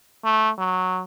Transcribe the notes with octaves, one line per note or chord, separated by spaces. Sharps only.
A3
F#3